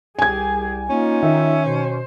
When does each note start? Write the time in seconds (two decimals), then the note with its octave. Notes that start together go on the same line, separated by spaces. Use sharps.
0.19 C2 G4 G#4 G#5 G#6
0.90 A#3 C#4 D#4 F4
1.22 D#3 E5
1.65 B2 C5